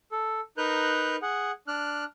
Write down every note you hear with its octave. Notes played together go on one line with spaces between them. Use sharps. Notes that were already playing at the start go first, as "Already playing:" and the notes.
A4
D#4 A#4 B4 A#5 F#6 G6
G#4 F#5
D4 F6 F#6